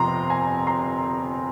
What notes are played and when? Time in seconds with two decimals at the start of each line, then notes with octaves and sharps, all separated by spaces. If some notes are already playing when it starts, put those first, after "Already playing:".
Already playing: G1 F2 C3 F3 A#5 C6
0.30 G#5 A#5
0.67 A#5 C6